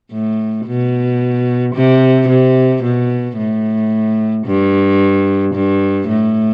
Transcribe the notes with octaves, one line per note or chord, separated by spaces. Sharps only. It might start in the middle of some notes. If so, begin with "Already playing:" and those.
A2
B2
C3
C3
B2
A2
G2
G2
A2